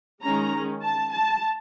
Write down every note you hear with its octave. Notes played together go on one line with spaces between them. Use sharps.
D#3 G#3 C#4 A#5
A5
A5